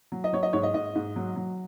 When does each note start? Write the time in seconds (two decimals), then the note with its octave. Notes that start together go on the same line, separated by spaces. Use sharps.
0.12 F#3
0.24 D#5
0.33 F#3 C#5
0.43 D#5
0.53 G#2 C#5
0.63 D#5
0.74 G#2 D#5
0.95 G#2
1.16 F#3
1.36 F#3